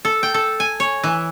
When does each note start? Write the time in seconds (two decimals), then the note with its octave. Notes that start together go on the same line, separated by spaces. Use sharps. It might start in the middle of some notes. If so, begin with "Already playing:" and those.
0.05 A4
0.23 G5
0.34 A4
0.60 G#5
0.80 C#5
1.03 E3